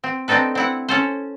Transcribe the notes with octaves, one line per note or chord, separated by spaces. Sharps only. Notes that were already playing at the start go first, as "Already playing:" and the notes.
C4
C4 D4 D#4 A4 B4
C4 E4 F#5
C#4 A4 C5